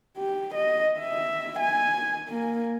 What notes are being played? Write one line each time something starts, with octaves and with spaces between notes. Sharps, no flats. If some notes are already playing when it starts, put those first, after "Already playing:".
G4
D#5
E5
G#5
A#3